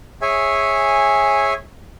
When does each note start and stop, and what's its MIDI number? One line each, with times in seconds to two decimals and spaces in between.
0.22 1.54 68
0.22 1.54 73
0.22 1.54 76
0.22 1.54 80